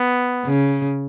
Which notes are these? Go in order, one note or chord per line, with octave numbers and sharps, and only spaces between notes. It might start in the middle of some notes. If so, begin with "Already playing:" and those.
Already playing: B3
C#3